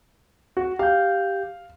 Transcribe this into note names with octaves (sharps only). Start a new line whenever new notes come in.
F#4
G4 F5 G6